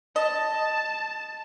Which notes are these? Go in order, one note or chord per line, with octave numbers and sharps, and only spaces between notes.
D#5 A5